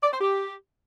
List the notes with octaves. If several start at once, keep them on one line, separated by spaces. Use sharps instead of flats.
D5
C5
G4